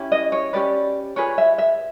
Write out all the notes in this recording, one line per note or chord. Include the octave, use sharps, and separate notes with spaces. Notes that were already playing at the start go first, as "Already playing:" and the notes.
Already playing: C#4 E4 G4
D#5
C#5
C#4 E4 G4 B4 D5
F4 G#4 B4 C#5
E5
E5